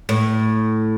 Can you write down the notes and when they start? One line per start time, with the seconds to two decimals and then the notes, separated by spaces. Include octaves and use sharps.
0.09 A2